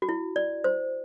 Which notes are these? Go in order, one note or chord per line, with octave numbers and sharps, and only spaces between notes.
F#4
E4
D5
C5